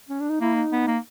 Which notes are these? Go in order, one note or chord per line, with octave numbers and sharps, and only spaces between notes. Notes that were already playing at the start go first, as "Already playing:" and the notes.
C#4
D4
D#4
A#3 E4
D#4
B3
A#3